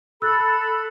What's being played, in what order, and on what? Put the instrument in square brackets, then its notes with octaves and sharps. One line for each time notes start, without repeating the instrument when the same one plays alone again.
[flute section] A4 B5 [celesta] E6 F#6 A6